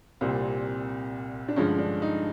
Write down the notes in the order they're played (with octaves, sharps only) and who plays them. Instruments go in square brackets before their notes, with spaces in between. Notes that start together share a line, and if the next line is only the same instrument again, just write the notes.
[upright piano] C2 A#2 G3 C4
D4
G2 D3 F3 G#3 C#4
D4
D#4